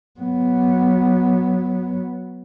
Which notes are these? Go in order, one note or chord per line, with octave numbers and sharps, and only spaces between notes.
F#3 B3